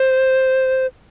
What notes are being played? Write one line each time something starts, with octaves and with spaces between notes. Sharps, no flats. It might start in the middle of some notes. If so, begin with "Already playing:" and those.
Already playing: C5